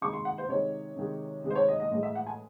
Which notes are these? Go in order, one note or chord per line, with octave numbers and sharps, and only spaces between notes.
C3 D#3 G#3 C#6
C6
F#5
C5
C3 D#3 G#3 C#5
C3 D#3 G#3
C3 D#3 G#3
C5
C#5
D#5
D#5
A2 E3 G#3 D#5
E5
F#5
G#5